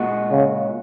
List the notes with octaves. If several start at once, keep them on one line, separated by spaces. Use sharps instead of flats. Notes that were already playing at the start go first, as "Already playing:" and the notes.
Already playing: A#2 G#3 F#4
C#3